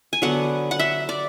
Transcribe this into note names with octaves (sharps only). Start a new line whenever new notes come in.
G#5
D3 F#3 B3 F#5
F#5
E5
D5